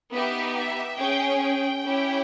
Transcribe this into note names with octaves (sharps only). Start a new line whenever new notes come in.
B3 D#4 G4 E5
E5
C#4 G#4 G5
G5
C#4 E4 G4